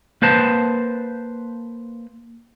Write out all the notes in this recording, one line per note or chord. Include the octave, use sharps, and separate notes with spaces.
A#3 B4 C5 A5